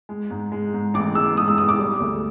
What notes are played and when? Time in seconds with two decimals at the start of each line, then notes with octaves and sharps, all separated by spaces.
0.09 G#3
0.30 G#2
0.52 G#3
0.74 G#2
0.94 A1 D6
1.15 G#3 E6
1.37 G#2 D#6
1.48 E6
1.58 G#2 D#6
1.69 D6
1.79 G3
2.00 D2